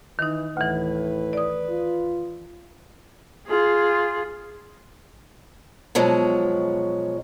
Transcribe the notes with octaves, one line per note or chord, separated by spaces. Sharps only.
D#3 E3 D#4
D2 A2 E3 B4
D5 D#6
F4
F4 G#4
B2 F3 F#3 G#3